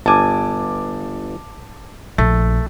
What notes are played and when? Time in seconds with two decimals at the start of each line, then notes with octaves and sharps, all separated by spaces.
0.06 G1 G#5 A5 D6
2.18 A#1 A3